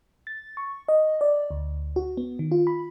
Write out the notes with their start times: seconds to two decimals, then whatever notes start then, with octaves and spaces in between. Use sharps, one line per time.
0.27 A6
0.57 C#6
0.88 D#5
1.21 D5
1.51 D2
1.96 F#4
2.17 B3
2.39 D#3
2.51 F4
2.67 B5